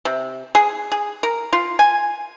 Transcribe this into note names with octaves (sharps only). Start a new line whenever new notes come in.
C3
G#4
G#4
A#4
F4
G#5